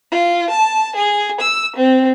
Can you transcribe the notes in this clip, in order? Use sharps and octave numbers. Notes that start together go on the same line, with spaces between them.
F4
A5
G#4
E6
C4